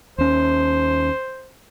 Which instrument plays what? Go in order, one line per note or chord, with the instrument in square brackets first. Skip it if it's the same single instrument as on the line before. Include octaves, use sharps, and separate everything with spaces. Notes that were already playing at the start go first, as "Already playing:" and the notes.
[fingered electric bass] D#2 C#4 [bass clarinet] C5